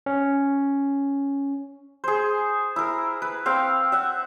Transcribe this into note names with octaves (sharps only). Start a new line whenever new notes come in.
C#4
G#4 C5
E4 A#4
B4
C4 F5 G5
E5 F#5